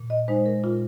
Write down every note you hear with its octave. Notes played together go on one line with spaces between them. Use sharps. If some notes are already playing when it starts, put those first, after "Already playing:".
Already playing: A#2
D#5
G#3 D#4 C5
A#4
A#2 F4
A#4